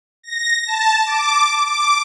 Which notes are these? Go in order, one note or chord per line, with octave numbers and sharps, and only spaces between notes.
A#6
A5
D6
D6